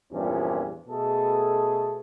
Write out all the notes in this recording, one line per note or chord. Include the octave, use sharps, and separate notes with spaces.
E2 G2 A#2 F3 C#4
B2 A3 B3 G#4 A4